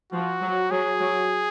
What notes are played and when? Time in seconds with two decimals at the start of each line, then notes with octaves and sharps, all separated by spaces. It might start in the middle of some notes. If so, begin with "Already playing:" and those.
0.12 F3 F#4
0.41 F#3
0.71 F#3 G#4
1.00 F#3